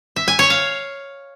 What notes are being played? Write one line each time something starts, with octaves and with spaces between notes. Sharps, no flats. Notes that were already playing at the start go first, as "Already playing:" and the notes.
E5
G#5
C#5
F5